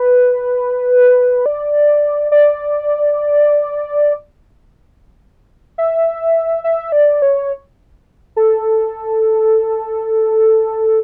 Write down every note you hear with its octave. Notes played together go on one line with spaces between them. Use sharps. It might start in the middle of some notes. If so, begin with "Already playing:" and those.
Already playing: B4
D5
D5
E5
E5
D5
C#5
A4